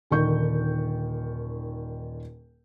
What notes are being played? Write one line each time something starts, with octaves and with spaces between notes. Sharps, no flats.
D#1 D3 D#3 C#6 G6